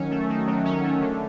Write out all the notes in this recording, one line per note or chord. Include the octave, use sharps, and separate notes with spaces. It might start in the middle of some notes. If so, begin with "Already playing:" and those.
Already playing: D#3 F#3 C#4
A3
D#3
F#3
C#4
A3
D3